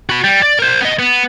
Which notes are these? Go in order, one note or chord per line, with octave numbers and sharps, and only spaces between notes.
F#4 B5
G3
D5
A#4 C5
B3 D#5
B3